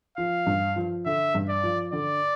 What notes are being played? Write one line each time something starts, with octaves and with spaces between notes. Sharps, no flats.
F3 F5
G2
F3
D3 E5
G2
D5
F3
D3 D5